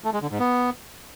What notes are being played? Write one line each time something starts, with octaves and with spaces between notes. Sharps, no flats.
A3
G#3
D3
G#2
B3